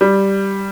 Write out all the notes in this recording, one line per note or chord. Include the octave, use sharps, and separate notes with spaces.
G3